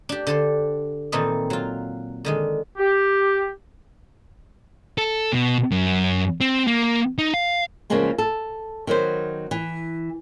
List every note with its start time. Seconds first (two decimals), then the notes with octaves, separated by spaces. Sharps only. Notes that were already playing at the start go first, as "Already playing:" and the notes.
0.09 D4 G4
0.27 D3 A4 C5
1.12 A#2 D#3 E3 C4 D#4 A4
1.50 F#3 F4
2.25 D3 D#3 G#3
2.78 G4
4.98 A4
5.32 B2
5.71 F#2
6.41 C4
6.67 A#3
7.18 D#4
7.34 F5
7.90 C#3 E3 F3 G#3 A#3 B3
8.18 A4
8.87 D#3 F#3 B3 C5
9.51 E3